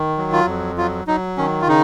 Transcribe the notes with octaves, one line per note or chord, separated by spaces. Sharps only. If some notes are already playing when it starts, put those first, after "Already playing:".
Already playing: D#3
F#3
F4
F2
F#3 F4
F#3 D#4
D#3 C#4
F4
C#3 D#4